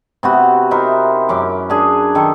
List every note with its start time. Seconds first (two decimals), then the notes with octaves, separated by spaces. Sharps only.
0.23 C3 B3 F#4
0.71 D#4 E4 A#4 C5
1.29 F#2 C#4 D6
1.70 D4 G#4
2.15 D#3 A4